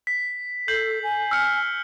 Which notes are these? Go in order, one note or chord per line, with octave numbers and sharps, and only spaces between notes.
B6
A4 G6 C7 F#7
G#5
E6 F6 C#7